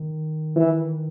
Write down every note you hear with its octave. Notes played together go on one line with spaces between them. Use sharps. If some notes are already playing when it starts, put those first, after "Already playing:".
Already playing: D#3
E3